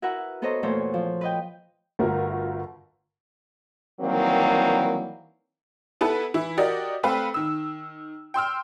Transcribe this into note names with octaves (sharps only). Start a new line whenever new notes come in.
E4 F#4 A#4 B4 E5 F#5
B3 A4 C5 C#5 D#5 A#5
E2 A#2 A3 A4 C5 C#5
F3
B4 D#5 G5
G1 A3 F4 F#4 A#4
D#3 E3 F#3 G3 A#3 C4
B3 E4 A4 B4
E3 E4
F#4 G4 A#4 D5 D#5
A3 C4 A4 B4 F5
D#3 E6
G5 C6 E6 F6